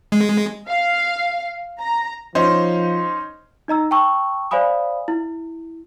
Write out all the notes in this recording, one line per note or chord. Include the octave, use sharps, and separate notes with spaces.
G#3
F5
A#5
F3 C#4 D#4 C5
D#4 D#5 A#5 E6
G5 A5 C#6 E6
C5 D5 F5 G#5 B5 D#6
E4